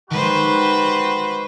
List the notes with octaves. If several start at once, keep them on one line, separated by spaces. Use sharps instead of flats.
D#3 G3 G#3 F#4 B4 C5